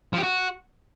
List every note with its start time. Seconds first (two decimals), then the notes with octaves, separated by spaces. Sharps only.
0.13 F3
0.18 G4
0.23 F#4